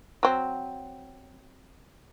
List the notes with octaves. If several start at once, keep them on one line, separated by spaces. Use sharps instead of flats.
F#3 C4